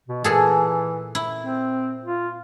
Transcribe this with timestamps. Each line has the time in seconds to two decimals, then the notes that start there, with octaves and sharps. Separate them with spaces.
0.08 B2
0.24 A#2 E3 G#4 A4
1.15 E4
1.39 C4
2.04 F4